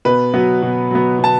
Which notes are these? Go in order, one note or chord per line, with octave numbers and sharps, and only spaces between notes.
B2 B4
F#3 B3
B2
F#3 B3
B2 A5